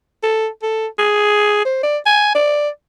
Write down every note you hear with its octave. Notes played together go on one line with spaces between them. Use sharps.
A4
A4
G#4
C5
D5
G#5
D5